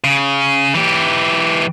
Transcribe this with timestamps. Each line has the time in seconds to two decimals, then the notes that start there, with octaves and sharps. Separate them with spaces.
0.04 C#3
0.75 E3 G4